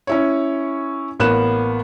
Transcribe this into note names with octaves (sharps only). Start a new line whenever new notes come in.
C#4 E4 C#5
A1 A#3 B3 F#6 E7